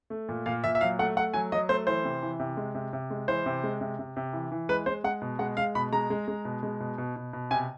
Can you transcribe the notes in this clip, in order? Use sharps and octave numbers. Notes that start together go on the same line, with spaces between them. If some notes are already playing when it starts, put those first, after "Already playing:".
A3
A#2
A#2 F5
A#2 E5
E5
F#3 F5
A3 F#5
A3 F#5
F#3 G#5
F#3 D#5
A3 C5
E3 C5
C3
E3
C3
G#3
C3
C3
G#3
E3 C5
C3
G#3
C3
C3
C3
E3
E3
G#3 B4
G#3 C5
G#3 F#5
B2
G#3 F#5
G#3 F5
B2 B5
G#3 A#5
G#3
G#3
B2
G#3
B2
B2
B2
B2
C3 G#5